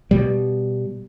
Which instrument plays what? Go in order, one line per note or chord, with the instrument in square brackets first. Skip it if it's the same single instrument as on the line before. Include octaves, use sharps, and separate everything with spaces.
[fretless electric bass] B2 G3